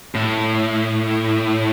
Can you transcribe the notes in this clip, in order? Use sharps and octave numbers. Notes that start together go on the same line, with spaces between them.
A2